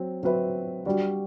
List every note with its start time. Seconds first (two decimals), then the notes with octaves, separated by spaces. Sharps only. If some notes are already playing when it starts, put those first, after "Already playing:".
Already playing: F#3 C4
0.23 F#3 C4 F#4 B4 E5
0.86 G3 D4 F#4